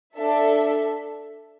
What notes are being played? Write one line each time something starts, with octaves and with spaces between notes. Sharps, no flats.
D4 A4 E5